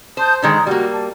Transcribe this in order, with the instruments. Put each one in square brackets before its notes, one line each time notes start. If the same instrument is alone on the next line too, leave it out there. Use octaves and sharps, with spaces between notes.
[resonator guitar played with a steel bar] C5 [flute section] A5 D#6 G6
[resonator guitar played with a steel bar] D3 D#3 G#3 [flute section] A#5 D#6
[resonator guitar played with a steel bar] G3 A#3 [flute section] F#4
[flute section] A5